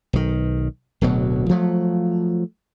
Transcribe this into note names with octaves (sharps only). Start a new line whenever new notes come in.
B1 D#3
D1 D2 B2 F#3
F3 F#3 A3